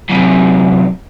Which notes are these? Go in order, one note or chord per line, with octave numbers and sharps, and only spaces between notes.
F#2 C3